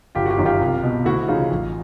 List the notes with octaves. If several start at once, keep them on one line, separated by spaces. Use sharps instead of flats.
G1 F4 G4
F#4
F4 G4
F#2 D#3
F4 G4
C2
B2
D2 E4 F#4
C#3 E3 D#4 F4
A1